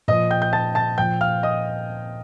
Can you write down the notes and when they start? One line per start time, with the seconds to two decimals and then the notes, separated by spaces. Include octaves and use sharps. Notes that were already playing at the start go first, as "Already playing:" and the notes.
0.08 A#2 F3 D#5 D#6
0.30 G5 G6
0.42 G6
0.53 A5 A6
0.75 A5 A6
0.98 A#2 F3 G5 G6
1.21 F5 F6
1.43 D#5 D#6